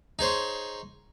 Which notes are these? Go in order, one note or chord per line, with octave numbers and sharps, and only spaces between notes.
D#4 G#4 C5 C#5